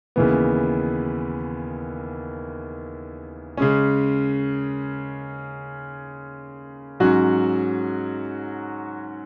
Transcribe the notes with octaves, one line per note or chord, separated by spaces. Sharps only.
D#2 C#3 E3 B3
C#3 G#3 C#4
G#2 F#3 C#4 F#4